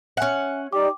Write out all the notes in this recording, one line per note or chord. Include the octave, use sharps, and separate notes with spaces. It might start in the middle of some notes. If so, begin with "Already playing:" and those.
C#4 E5 F#5 G#5
D#4 G4 D5 G5 D6